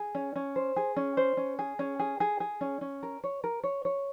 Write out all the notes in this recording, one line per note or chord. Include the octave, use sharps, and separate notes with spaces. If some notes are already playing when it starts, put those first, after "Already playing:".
Already playing: G#4
C#4
C#4
C5
G#4
C#4
C5
C#4
G#4
C#4
G#4
G#4
G#4
C#4
C#4
A#4
C#5
A#4
C#5
C#5